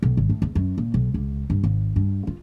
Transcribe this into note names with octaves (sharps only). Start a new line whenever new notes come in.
B1
G#1
A2
E2
F#2
A#2
B1
C#2
G2
G#1
G2
F4